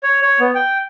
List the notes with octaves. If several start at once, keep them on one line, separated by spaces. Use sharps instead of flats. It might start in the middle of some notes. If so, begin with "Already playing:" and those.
C#5
C#5
B3
G5